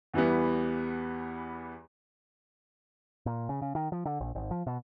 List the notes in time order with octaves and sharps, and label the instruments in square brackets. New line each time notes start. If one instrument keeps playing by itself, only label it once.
[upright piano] E2 E3 G3 B3
[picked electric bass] A#2
C#3
C#3
D#3
F3
D3
A#1
G#1
F3
B2